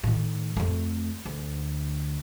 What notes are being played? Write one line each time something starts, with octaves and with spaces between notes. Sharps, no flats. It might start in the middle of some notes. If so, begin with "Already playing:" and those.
A2 D#3
F2 A3
D2